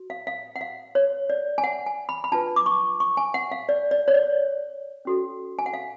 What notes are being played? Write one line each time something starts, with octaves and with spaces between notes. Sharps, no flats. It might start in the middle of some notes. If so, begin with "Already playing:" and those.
Already playing: F#4
F5
F5
F#5
F5
C#5
D5
G#5
F#5
G#5
B5
B5
D4 F4 B4 A5
D6
C#6
C#6
G#5
F#5
F5
D5
D5
C#5
D5
C#4 F#4 A4
G#5
F#5
F5